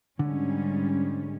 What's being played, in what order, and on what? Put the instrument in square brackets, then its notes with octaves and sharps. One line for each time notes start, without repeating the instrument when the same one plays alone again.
[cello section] G#2 G3 C#4 [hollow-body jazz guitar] D3